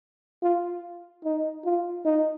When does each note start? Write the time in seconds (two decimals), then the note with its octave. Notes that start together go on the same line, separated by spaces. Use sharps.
0.42 F4
1.24 D#4
1.65 F4
2.05 D#4